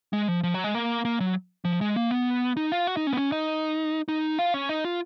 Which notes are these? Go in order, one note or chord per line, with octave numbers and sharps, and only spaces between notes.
G#3
F3
F3
F#3
G#3
A#3
A#3
F#3
F3
G#3
A#3
B3
D#4
F4
F#4
D#4
C#4
B3
C#4
D#4
D#4
F4
C#4
D#4
F4